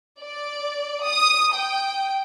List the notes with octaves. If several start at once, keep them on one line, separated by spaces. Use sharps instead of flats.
D5
D#6
G5